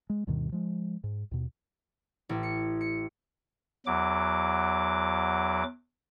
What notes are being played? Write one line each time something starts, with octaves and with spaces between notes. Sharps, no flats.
G#3
D2 G2 B2 D#3
F3 G#3
G#2
D#2 B2
A1
C#7
C#7
E2 F#3 D6